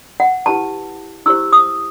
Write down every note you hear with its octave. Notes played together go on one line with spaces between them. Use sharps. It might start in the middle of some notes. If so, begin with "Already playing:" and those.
F#5
E4 G4 B4 A5
E4 G4 C5 E6
D#6